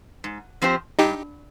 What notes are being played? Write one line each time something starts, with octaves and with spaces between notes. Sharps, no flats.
G#2
F3 C4 G4 C5
G2 D#4 G4